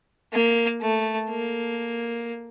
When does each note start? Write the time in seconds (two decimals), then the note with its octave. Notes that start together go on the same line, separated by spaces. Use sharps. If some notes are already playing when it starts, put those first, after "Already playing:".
0.33 A#3
0.82 A3
1.30 A#3